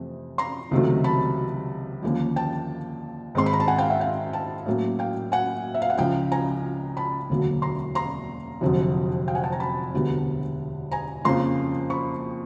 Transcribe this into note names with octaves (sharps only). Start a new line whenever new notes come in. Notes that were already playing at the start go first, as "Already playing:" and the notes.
Already playing: F2 C3 E3 A3
A#5 C6
C#2 C3 D#3 F#3 A3
A5 B5
D#2 D3 F3 A#3 C#4
G5 A5
G#2 D#3 G#3 C4 C6
B5
A#5
A5
F#5 G#5
F5 G5
E5 F#5
F5 G5
G5 A5
A2 F#3 A#3 C#4
F5 G5
F#5 G#5
E5
F5
F#5
C#2 C#3 F3 F5 G5
G#5 A#5
A5 B5
E1 D2 D3 F#3 A#3
A#5 C6
A#5 C6
F1 F2 D3 F#3
F5 G5
F#5 G#5
G5 A5
G#5 A#5
A5 B5
E1 D2 D3 G3 B3
G#5 A#5
F2 C#3 F3 A#3 A#5 C6
B5 C#6